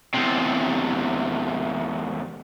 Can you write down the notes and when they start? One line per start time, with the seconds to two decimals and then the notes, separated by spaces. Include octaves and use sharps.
0.14 E2 C3